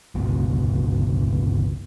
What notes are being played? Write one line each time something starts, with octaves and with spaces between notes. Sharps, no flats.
G1 C#2 B2